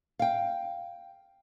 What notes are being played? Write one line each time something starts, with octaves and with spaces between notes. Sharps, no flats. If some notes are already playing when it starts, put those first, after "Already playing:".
F5 G5